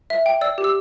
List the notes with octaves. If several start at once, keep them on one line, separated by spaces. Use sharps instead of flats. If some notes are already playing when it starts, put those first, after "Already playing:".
E5
G5
D5 E6
G4
E6